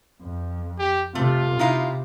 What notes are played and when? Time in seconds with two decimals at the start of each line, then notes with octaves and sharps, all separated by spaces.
0.23 F2
0.79 G4
1.15 C3 A3 F4
1.59 C3 D#4 E4 F5